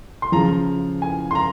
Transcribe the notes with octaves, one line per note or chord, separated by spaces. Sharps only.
C6
C#3 F3 A#5
G#5
C6
A#5